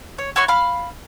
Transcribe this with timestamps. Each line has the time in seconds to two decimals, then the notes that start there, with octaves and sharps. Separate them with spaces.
0.18 C#5
0.36 E4 F#4 C#5 C#6
0.48 F5 B5 F6